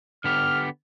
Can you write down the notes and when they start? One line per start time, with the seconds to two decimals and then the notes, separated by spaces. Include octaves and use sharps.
0.24 D3 B3 G4 F6